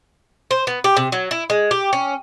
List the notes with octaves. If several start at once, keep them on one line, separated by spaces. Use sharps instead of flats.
C5
B3
G4
C3
F#3
E4
G#3
G4
C#4